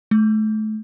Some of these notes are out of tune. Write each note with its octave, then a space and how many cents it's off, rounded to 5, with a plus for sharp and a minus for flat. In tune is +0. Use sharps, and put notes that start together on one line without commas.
A3 -30